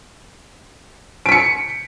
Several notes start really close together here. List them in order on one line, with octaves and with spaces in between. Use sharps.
D7 B6 C#7